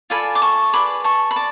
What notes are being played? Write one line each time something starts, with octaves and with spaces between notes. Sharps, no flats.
F4 A4 D5 G#5 B5
D6
A5 C#6
G#4 B4 D5 B5 D6
A5 C#6
B5
D5 A5